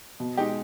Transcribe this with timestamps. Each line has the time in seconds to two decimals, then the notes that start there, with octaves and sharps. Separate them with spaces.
0.20 B2
0.38 G#3 D#4 G4